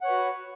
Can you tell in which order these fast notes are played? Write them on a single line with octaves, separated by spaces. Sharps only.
F#5 C#5 B4 F#4